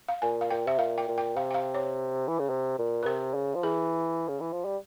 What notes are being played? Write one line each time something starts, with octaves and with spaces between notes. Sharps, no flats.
F5
A#2 G#5
F5
A#2 G5
C3 E5
A#2 F5
G5
A#2
G5
C3 F5
G5
F5
C#5
E3
C#3
C3
A#2
A#4
C3 C5
C#3
F3
E3 G#4
C#3
E3
F3
G3